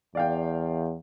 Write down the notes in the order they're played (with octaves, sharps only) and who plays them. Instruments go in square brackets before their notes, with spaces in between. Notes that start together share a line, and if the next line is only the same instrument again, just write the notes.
[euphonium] E2 [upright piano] D5 F5 G5